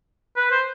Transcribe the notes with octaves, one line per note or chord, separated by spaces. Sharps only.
B4
C5